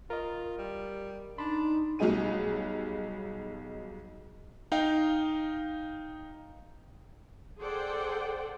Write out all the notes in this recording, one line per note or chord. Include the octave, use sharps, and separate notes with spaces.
F4 A#4 D#5
G3
G4
D4 D#4 B5 C6
B1 F#3 G3 D#4 G#4 D#7
D#4 F5 G5
G#4 A4 C5 D5 F#5 G5